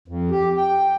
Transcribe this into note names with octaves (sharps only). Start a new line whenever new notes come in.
F2
G4
G5